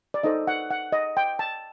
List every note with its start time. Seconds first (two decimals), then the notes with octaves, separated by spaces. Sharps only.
0.14 D5
0.23 D#4 A4 C5 D#5
0.47 F#5
0.71 F#5
0.92 D#5
1.17 G5
1.39 A5